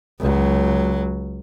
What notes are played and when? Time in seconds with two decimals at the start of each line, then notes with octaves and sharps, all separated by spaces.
0.20 C#2 F#3